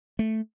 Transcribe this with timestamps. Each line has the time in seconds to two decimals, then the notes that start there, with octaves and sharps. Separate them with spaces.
0.19 A3